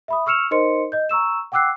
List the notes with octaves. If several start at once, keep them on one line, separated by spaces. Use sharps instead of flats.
E5 B5 D#6
C#6 E6 F6 C#7 E7 F7
D#4 A#4 C5 D#5 C6 C#7
D#5 G6
A#5 C#6 E6 E7
F#5 G5 D6 E6 F#6 C7